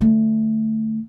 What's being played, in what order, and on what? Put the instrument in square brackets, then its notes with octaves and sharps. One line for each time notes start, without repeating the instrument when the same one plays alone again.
[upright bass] D3 A3